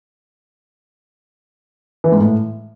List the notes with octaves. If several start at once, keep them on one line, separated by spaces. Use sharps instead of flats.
E3
G#2
A2